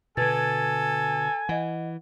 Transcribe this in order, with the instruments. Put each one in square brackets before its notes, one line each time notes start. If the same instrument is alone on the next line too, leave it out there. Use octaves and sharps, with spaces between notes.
[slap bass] B2 D3 [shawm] A4 [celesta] B4 G#6 A6 [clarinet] G#5
[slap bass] E3 [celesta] D#5 F#5